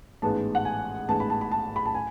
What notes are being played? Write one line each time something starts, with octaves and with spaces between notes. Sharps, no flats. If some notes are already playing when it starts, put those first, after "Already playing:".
A1 G#2 G#3 B3 A5
F#5
G#5
A1 G#2 G#3 B3 A5
B5
A5
B5
A5
B5
A5
G#5